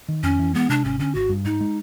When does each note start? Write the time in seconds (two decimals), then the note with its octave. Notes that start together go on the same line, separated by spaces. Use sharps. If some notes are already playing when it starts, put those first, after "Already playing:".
0.08 D#3
0.23 F2 C#4
0.39 E3
0.54 G#3 B3
0.69 C3 D4
0.84 G#1 C#4
0.99 D3 C#4
1.15 G#1 F#4
1.29 G2
1.45 G#2 D#4
1.61 G#3